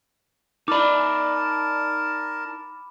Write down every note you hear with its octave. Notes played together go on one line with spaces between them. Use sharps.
D#4 A#4 D5 A5 B5 D6